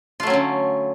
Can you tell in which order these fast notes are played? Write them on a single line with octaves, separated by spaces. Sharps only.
F4 A3 F#3 C#4 D3